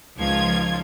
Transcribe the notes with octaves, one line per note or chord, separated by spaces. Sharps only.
C#2 D#3 F3 F4 G#6